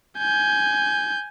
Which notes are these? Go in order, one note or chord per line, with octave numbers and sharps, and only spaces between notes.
G#5 G6